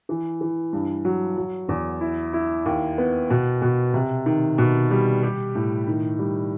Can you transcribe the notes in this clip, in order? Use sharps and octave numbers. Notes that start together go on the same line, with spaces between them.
E3
E3
G2
F#3
F#3
E2
E4
E4
D#2
B3
B2
B2
C3
D#3
B2
G3
G4
A2
D#3
G3